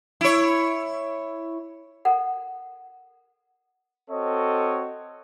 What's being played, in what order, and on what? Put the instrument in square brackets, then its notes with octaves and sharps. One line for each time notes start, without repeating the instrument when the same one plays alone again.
[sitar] E4 C#5
[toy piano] A4 A#4 F#5
[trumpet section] C4 F#4 A4 C#5 D#5